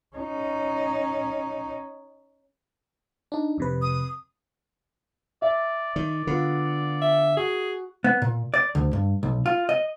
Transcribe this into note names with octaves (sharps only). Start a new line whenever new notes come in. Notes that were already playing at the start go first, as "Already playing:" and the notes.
C#4 D#4
D4 D#4
F2 C3 B4
D#6
D5 E5
D#3 D5
D3 B3 F4
E5
F#4 G#4
B3
A#2
D5
D2
G2
B1
F4
D#5